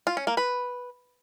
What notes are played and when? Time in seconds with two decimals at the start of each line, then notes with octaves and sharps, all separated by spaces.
0.07 F4
0.17 C#4
0.27 A#3
0.37 B4